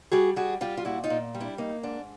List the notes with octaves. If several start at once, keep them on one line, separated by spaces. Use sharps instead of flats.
G3 F#4 G#4
G3 F#4 G#4
G3 F4 G4
F4
A#2 E4 F#4
D#4 F4
A#2
G3
D4 E4
A#3 D#4
G#2 D4